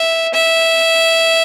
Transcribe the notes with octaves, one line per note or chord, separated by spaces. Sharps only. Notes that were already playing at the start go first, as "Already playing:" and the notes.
Already playing: E5
E5